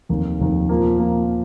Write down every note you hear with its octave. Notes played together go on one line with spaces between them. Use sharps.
F1 D#2 D#3
F1 D#2 D#3
A#2 F3 A#3
A#2 F3 A#3